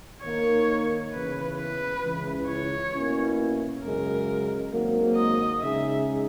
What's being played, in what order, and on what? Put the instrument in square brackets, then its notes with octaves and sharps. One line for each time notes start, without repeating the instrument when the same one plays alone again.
[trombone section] D#3 A#3 D#4 A#4 [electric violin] C#5
[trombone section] E2 C#3 E3 [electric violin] B4
[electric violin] B4
[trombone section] C#2 C#3 E3
[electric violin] C#5
[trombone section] B2 A#3 C#4 E4
[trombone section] F#2 C#3 G#3 [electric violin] A#4
[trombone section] G#1 G#2 F#3 A#3
[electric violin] D#5
[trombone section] C#3 G#3 D#4 G#4 [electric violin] E5